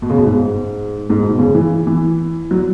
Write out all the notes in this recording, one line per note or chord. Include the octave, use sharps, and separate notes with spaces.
B2
C#3
B2
G#2
G#2
B2
C#3
E3
E3
F#3